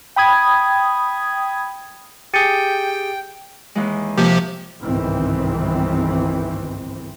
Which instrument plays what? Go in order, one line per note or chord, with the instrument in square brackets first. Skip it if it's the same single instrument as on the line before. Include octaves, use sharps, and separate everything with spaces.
[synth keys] G5 B5 D#6 G#6
[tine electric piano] G4 G#4 [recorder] G5 [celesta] A6 C#7 D#7
[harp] D#2 E3 G#3
[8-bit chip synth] C3 F3 G4 [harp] A#3
[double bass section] G1 C2 G#2 D#3 E3 C4